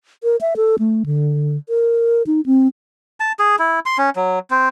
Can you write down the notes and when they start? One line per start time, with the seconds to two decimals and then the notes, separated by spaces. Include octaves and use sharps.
0.24 A#4
0.41 E5
0.56 A4
0.79 A3
1.06 D3
1.69 A#4
2.27 D#4
2.46 C4
3.20 A5
3.39 G#4
3.59 E4
3.86 C6
3.98 C#4
4.16 F#3
4.51 C4